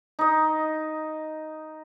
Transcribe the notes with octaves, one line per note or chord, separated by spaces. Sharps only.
D#4 D#5